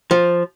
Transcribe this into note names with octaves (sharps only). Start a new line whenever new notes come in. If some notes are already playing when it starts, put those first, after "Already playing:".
F3